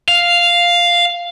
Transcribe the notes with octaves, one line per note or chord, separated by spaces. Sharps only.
F5